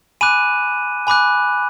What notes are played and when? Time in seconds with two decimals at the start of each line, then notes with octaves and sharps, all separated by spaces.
0.21 G#5 B5 D6 F#6 D#7
1.07 G#5 B5 D6 F#6